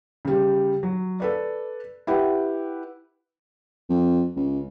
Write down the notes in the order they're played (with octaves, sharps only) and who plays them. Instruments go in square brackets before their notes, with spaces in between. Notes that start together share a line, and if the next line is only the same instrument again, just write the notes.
[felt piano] C#3 G3
F#3
A4 B4 D5
E4 G4 B4 F#5
[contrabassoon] F2
C#2